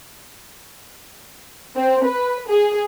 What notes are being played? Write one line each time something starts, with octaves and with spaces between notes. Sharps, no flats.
C4
B4
G#4